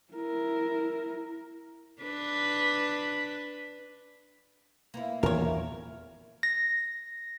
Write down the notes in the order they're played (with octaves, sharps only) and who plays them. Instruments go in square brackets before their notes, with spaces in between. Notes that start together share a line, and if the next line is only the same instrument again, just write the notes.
[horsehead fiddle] E4 A#4
[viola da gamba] D4 B4
[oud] A#3 B3 E4
[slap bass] E2 A#2 D#3 [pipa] A#4 C#5
[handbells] A#6